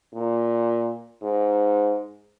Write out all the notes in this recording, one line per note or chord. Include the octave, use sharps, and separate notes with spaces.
A#2
G#2